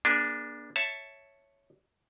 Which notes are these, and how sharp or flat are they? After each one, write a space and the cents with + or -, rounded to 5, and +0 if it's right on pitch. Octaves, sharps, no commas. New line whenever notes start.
A#3 +40 D4 +0 G#4 +0
C#5 +0 E5 +0 A5 +0